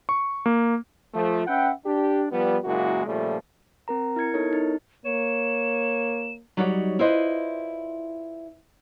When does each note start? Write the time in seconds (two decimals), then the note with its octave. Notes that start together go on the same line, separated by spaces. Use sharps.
0.09 C#6
0.46 A#3
1.14 F3 A3
1.47 C#4 B4 E5 F#5 G5
1.86 D4 G4
2.32 F3 G3 B3
2.65 F#1 A#2 G#3 A#3 E4 F#4
3.06 A#2 C#3 F3 G3 A3
3.88 C4 A#4 A#5
4.16 E4 A#4 G#6 C#7
4.34 B3 D#4 E4 A4 A#4 C#5
4.53 D#4
5.05 A#3 C#5 E7
6.57 F#3 G3 D#4 F#4 C#5 D5
6.99 E4 F4 B4 C5 D5 D#5